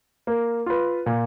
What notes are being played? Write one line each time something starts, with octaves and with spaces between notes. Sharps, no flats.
A#3
F4 B4
A#2